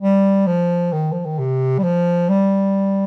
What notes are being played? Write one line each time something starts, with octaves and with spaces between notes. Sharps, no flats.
G3
F3
D#3
F3
D#3
C3
G3
F3
G3